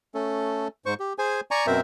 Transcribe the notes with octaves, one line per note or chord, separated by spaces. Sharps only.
A3 C#4 A4
G#2 C5 C#6
G4
G#4 C5 G#5
D5 G#5 A#5 C#6
F#2 B2 C4 A#4 C5 E5